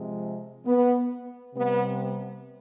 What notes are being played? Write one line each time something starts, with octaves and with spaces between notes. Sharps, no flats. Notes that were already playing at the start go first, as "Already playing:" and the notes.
Already playing: C3 F3 G#3
B3
C3 G3 B3